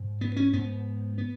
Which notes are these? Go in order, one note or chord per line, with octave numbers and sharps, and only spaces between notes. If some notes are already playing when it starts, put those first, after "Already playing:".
Already playing: G#2
B3
C#4
G#2 B3
B3